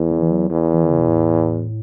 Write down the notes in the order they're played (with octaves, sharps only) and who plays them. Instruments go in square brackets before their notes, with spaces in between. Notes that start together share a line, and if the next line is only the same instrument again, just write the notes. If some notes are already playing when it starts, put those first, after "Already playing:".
Already playing: [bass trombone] E2
[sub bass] E3
E3
F#3
[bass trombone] E2
[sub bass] E3
D#3
C#3
B2
A2